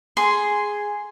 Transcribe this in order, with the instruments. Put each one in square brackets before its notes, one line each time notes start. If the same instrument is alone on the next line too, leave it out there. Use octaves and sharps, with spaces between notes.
[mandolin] G#4 [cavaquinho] C6